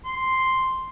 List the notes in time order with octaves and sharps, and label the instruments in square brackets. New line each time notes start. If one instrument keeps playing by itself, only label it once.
[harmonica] C6